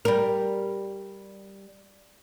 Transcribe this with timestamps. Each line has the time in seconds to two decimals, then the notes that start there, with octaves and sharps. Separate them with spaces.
0.05 G3 A#4